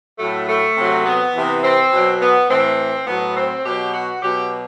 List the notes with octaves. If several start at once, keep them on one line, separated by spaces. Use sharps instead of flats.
A2 F#3 A3
A3
C3 F#3
B3
C3 E3
C4
B2 F#3
B3
A2 E3 C4
A2 F#3 B3
C4
B2 F#3 G4
F#4
B2 F#3 G4